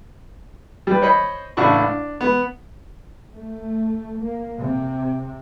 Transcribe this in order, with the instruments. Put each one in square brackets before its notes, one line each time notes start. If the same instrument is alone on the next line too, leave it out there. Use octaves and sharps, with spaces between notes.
[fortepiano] G3 B4
C5 C#5 D#5 B5
A1 C#3 D4 E4 F#5 C#6
D4
B3
[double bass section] A3
A#3
C3